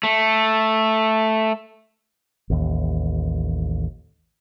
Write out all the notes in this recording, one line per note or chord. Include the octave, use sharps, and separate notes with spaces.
A3
A1 D#2